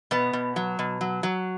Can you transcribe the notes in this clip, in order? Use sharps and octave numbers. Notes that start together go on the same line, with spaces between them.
B2 B3
B2
F#3
B2
F#3
F#3